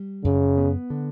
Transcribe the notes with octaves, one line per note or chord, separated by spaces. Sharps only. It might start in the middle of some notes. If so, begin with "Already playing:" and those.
Already playing: G3
F#2 C#3
B3
D3